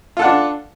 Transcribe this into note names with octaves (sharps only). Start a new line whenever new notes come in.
D4 F4 A4 F#5